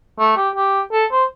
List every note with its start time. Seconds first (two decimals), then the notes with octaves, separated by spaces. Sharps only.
0.19 A3
0.37 G4
0.55 G4
0.92 A4
1.11 C5